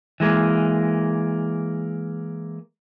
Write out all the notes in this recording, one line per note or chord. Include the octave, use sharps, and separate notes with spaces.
E3 G#3 A#3